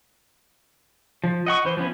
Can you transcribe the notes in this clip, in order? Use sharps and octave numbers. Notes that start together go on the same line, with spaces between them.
F3
D#5 F#5 C#6
E3 C5
F3 B3 C#4 E4